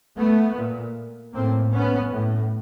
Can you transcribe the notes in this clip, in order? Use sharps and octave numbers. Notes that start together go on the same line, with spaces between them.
A3 B3
A#2
A2 A#3 C4
B3 C#4
A2